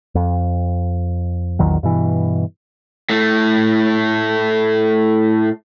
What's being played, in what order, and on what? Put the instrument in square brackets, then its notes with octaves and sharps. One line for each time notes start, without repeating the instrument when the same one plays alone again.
[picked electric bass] F2
A#1 E2 D#3 F#3
G2 B2 E3
[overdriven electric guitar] A2 A3